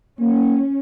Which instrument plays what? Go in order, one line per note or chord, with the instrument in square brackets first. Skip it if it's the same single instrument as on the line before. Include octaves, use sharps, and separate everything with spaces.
[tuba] A#3 [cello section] C#4